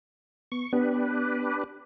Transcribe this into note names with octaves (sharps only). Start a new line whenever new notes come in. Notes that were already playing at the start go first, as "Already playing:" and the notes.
B3 C#6
B3 D4 G4 B4